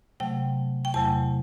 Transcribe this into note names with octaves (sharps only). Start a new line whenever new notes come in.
C3 F#3 A3 G5
G5
E2 C3 F#3 A3 A5